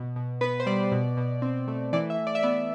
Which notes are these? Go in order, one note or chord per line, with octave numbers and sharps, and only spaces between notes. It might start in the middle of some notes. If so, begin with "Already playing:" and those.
Already playing: B2
B2
B3 B4
C5
G3 D5
B2
B2
C4
A3
E3 D5
E5
E3
D5
E5
B3 D5